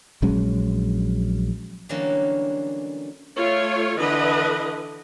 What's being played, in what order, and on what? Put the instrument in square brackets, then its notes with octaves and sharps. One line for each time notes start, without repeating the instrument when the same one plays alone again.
[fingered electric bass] A#1 F#3 G#3 C#4
[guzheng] D3 E3 F#3 G3 A#3 C#4
[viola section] A3 F4 C#5
D3 E3 B4 D#5